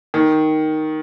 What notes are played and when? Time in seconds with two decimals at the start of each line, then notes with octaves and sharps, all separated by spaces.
0.14 D#3